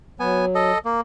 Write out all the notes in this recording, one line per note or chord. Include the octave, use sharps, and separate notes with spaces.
F#3 B3 G#5
A4 D#5
A#3